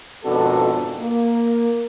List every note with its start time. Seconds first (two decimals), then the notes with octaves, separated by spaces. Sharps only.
0.24 G#1 F2 B2 D4 F#4 A4
0.99 A#3